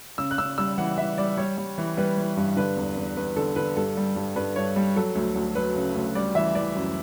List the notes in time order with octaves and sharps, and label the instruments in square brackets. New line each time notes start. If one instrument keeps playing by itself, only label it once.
[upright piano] C#3 E6
F#6
C#3 E6
G3 E6
E3 F#5
E3 E5
G3 D5
G3 C#5
G3
E3
G3 B4
E3
G2
D3 B4
E2
E2
E2 B4
D3 A4
D3 B4
G2 A4
G3
G2
G2 B4
G2 C#5
G3
F#3 A4
D2
D2
F#3 B4
C#3
D2
G3 D5
E3 E5
E3 D5
F#2